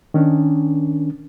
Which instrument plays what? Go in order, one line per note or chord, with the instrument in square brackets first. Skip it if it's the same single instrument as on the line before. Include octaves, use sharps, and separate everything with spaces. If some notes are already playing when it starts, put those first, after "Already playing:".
[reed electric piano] D#3 C#4 D4